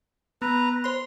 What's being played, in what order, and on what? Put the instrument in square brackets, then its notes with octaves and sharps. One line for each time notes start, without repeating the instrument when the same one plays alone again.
[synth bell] B3 [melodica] B4 A#5
[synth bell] C5 B5 [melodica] C6